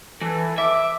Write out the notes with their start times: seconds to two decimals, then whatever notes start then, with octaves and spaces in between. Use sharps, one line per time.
0.21 E3 A4
0.58 E5 D6